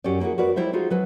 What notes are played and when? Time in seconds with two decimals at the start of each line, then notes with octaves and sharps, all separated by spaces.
0.04 F#2 C#4 F#4 G4 D5
0.20 A#3 C4 E4 F#4 G#4
0.38 F#4 A#4 B4 D5
0.56 G3 E4 C5 D#5 E5
0.73 D#4 F4 F#4 G#4
0.90 F#3 B4 D#5 G#5